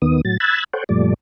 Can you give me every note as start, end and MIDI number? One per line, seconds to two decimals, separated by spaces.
0.02 0.21 39
0.02 0.21 51
0.02 0.21 59
0.02 0.21 87
0.25 0.37 45
0.25 0.37 54
0.25 0.37 93
0.40 0.64 83
0.40 0.64 88
0.40 0.64 90
0.40 0.64 92
0.40 0.64 93
0.73 0.84 69
0.73 0.84 72
0.73 0.84 73
0.73 0.84 78
0.73 0.84 79
0.89 1.14 42
0.89 1.14 46
0.89 1.14 53
0.89 1.14 55
0.89 1.14 57
0.89 1.14 74